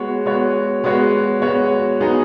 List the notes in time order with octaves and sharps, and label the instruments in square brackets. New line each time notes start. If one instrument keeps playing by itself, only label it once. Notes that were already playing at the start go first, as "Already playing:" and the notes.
Already playing: [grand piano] G#3 B3 F#4 C#5
G#3 B3 F#4 C#5
G#3 B3 F#4 C#5
G#3 B3 F#4 C#5
F#3 B3 D#4 G#4